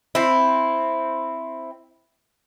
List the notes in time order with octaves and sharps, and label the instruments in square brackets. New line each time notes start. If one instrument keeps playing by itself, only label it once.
[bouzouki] C4 E4